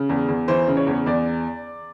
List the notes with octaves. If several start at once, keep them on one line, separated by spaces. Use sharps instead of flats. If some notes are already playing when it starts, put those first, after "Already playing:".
Already playing: C#3
E2
E2
E3 C5
C#3
C#5
E2
E2 D5